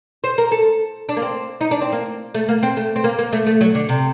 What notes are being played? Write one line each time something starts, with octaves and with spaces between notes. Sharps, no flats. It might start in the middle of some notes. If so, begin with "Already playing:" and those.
C5
A#4
A4
D4
A#3
C4
D#4
D4
C4
A#3
A3
A#3
C4
A3
C4
A#3
A#3
A3
A3
F#3
D3
C3